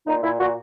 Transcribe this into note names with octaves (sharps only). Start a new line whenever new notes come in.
A#2 D#4
A#2 E4
A#2 F#4